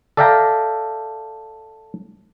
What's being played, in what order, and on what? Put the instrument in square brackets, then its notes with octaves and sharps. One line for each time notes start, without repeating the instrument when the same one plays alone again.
[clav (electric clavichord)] A4 D5 E5 F5 G5 A#5